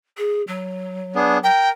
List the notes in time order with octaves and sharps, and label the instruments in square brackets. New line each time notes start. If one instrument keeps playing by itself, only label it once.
[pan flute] G#4
F#3
[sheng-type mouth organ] B3 D4 G#4
[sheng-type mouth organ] A#4 [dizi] G5